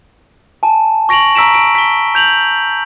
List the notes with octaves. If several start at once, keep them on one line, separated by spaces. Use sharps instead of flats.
G#5 A5
C#6 A#6 D7 F7 F#7
A#5 E6 B6 D7 E7
D7
B6 G7
G6 F7 F#7